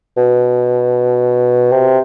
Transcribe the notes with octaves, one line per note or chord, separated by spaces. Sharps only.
B2
C3